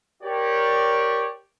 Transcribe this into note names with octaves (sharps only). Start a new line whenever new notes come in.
G4 A#4 C#5 D5